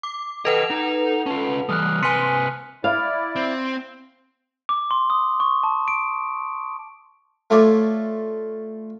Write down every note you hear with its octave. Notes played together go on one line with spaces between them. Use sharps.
D6
A4 B4 D#5 F#5 G5 F7
D#4
C#4 F4 A5
E3 G3 D#6 F6 F#6
C3 B4 G#5 C6 B6 C#7 D#7
E4 D5 F5
C4
D6
C6
D#6
C#6
A5
D7
A3 F4 C#5 D5